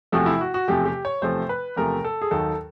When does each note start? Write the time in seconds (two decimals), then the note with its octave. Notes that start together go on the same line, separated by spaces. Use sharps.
0.12 E2 C3 F3 A3 F#4
0.26 E4
0.41 F#4
0.54 F#4
0.68 E2 C3 F3 A3 G4
0.85 G4
1.05 C#5
1.22 E2 C3 F3 A3 C5
1.49 B4
1.76 E2 C3 F3 A3 A#4
2.05 A4
2.22 G#4
2.31 D#2 D#3 F#3 A4